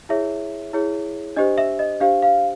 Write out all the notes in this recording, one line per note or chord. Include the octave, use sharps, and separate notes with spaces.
E4 G#4 C#5 E5
E4 G#4 C#5
D4 G4 C5 D#5
E5
D#5
D4 G4 C5 F5
F5